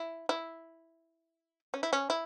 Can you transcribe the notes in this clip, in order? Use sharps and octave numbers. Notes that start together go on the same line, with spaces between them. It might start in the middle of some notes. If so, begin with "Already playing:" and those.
Already playing: E4
E4
C#4
E4
C#4
E4